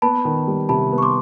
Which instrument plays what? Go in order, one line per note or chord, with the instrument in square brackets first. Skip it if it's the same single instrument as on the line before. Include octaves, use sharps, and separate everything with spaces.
[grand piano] B3 [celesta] A5 B5
[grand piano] D#3
G3
[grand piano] C3 [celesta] A5 B5
[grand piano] B3
[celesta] C#6
C6 D6